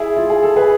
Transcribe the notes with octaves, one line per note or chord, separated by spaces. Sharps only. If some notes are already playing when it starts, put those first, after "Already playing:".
Already playing: E4 G#4
F4
G#4
A4
G#4 B4